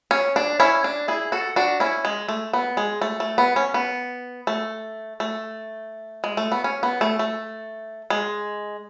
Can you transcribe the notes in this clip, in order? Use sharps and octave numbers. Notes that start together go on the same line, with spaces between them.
C#4
D4
C#4 E4
D4
E4 G#4
F#4 A4
D4 F#4
C#4 E4
G#3
A3
B3
G#3
A3
A3
B3
C#4
B3
A3
A3
G#3
A3
B3
C#4
B3
A3
A3
G#3